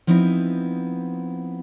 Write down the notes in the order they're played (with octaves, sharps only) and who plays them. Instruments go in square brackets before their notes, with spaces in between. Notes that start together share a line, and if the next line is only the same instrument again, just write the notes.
[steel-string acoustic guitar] F3 B3 C4 D#4 E4